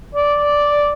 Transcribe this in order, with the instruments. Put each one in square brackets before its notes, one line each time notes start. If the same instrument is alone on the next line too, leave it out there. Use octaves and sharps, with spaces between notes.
[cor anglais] D5